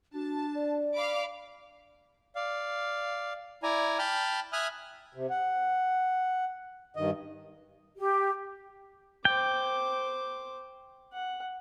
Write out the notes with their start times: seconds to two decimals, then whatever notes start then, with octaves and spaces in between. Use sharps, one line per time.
0.14 D4 F#4 A5
0.55 D5
0.95 F5 B5 D6
2.35 D5 F5
3.63 E4 D5 G#5 A#5
3.99 G5 A5 B5 F6
4.53 E5 G#5 D#6 F6 F#6
5.15 C3
5.30 F#5
6.96 G2 D#3 D#5
7.99 G4
9.25 C5 G5 D6
11.13 F#5